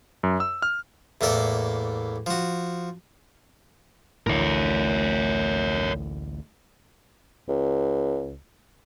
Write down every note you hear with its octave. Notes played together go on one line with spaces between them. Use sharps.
F#2
E6
F6
E2 A2 A#3 A4 D5
F3 F#4
A1 D2 A2 A#4 C#5
C#2